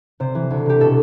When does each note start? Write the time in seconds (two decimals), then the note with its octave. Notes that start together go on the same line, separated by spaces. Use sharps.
0.20 C3 C5
0.35 E3
0.50 D2
0.66 C3 G4
0.81 B2 A4